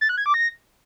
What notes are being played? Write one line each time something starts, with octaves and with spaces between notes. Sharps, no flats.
A6
F#6
G#6
D6
A#6